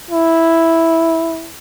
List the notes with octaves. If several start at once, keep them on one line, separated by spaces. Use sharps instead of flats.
E4